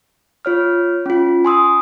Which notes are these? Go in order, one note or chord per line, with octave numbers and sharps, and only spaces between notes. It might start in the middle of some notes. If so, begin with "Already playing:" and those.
F4 C#5 F6
C#4 F4
G#5 C6 D#6 E6